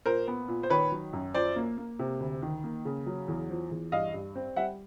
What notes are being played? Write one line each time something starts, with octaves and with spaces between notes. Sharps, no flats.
A#2 A#4 C5
B3
A#2
C5
D#3 B4 C#5
F#3
F#2
F3 C5 D5
A#3
A#3
C3
D2
D#3
A#3
C#3
F#3
E2
F3
E2
G2 D#5 F5
G2
C4
G3 E5 F#5